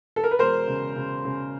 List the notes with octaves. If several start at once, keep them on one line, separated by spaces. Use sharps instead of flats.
A4
A#4
B4
E1 A#4 C5
C#3
C#3
C#3